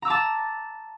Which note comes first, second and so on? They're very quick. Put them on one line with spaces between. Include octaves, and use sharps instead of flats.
A#5 E6 D6 A5